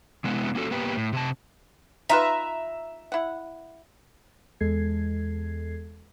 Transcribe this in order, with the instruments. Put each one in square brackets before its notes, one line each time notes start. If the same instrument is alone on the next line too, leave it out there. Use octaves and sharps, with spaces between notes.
[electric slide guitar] C3 G#3 B3 E4
A#3 C#4 F#4 A4
A#3 B3 G4 B4
A2
C3 C4 A5
[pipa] D#4 F4 B4 [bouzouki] E5 A#5
[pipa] E4 F#5
[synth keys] E2 G#3 A4 G#6 C7